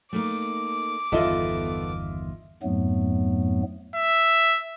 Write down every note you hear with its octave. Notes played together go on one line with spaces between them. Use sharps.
A3 A#3 D#4 D6
G1 E2 D#3 B3 F4 A4 D#5 E5
F2 G#2 F#3 A3 B3
E5